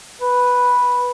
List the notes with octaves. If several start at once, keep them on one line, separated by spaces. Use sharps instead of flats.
B4